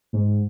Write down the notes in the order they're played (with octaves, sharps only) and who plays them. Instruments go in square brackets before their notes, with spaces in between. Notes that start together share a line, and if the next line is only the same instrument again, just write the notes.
[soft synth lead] G#2